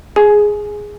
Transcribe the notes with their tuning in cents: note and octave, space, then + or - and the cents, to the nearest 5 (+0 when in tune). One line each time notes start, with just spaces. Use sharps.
G#4 +0 G#5 +20